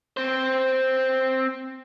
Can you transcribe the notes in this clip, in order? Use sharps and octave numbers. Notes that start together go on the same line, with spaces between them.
C4 C5